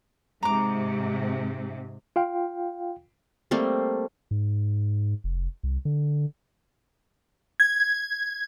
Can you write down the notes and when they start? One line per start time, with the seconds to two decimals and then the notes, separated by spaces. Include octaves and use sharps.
0.43 G#2 C3 A#5 D6
2.16 F4 F5 G5
3.51 G3 A3 A#3 C4
4.31 G#2
5.24 F1
5.63 C2
5.85 D3
7.60 G#6